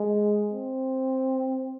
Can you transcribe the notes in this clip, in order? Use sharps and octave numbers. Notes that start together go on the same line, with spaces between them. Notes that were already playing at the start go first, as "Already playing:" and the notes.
Already playing: G#3
C4